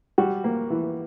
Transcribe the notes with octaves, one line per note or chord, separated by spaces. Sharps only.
G3 F#4
A#3
E3